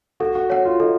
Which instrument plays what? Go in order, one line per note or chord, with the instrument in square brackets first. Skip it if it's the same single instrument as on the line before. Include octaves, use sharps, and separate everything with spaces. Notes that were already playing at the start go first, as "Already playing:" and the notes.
[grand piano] F#4 [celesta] A4
[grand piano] F#4
[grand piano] F#4 [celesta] C#5 F#5
[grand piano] F4
[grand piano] D#4 [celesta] A4